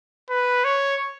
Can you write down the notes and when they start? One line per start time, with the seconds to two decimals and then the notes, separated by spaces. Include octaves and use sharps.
0.30 B4
0.65 C#5